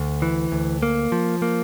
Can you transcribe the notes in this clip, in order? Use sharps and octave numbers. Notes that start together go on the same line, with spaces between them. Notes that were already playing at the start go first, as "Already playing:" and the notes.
Already playing: D2
E3
D2
A#3
F3
A#3